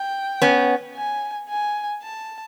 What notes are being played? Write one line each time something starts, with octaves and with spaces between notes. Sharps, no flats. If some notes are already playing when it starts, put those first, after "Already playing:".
Already playing: G5
B3 C#4
G#5
G#5
A5